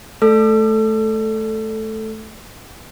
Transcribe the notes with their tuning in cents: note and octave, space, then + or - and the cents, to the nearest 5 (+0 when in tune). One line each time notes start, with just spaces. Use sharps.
A3 -15 A4 +0 E6 +35